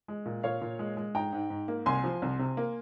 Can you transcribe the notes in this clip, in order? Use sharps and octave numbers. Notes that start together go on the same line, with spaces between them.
G#3
A#2
A#2 C#5 F5
A#2
G#3
G#3
G#2 G5 A#5
G#2
G#2
A#3
C2 G#5 C6
F3
C2
C3
A#3